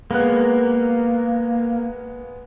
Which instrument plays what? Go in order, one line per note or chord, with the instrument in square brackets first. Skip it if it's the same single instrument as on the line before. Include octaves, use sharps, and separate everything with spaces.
[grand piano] G#3 B3 F#6 [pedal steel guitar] A#3